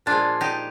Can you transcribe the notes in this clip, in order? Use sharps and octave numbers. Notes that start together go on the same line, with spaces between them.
A#2 F3 G#3 D4 F4
D#4 G4